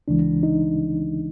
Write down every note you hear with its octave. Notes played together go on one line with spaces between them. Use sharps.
C#2 C#3 E3 G#3 D4
D#4